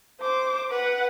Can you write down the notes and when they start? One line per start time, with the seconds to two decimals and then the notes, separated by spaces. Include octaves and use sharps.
0.21 C5 D6
0.71 B4 F#5